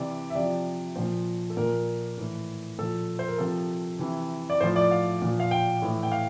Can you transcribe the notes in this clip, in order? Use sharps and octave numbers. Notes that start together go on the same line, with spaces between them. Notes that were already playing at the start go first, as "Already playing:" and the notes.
Already playing: C3 E3 D5
E5
C3 F3 D5
A#2 F3 C5
A4
A#2 F3 A#4
A2 E3
A#2 F3 A4
C5
A#4
C3 F3 A4
C3 E3
D5
A2 F3 C5
D5
F5
A#2 F3
F5
G5
A2 E3
G5
F5